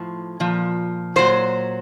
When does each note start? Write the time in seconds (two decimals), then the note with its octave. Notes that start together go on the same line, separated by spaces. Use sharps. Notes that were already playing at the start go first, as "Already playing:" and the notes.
Already playing: A2 F3
0.40 A#2 F3
1.16 A#2 F#3 C5